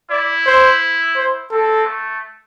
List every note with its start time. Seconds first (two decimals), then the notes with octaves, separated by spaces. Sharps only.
0.11 E4 D5
0.46 C5
1.16 C5
1.51 C4 A4
1.87 A3